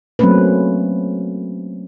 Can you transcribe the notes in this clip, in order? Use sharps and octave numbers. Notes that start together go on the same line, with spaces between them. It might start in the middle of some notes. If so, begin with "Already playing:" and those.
F#3 A3 A#3 C4 C#4 B4